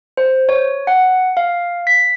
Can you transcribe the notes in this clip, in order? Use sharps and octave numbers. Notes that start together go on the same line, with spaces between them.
C5
C#5
F#5
F5
B6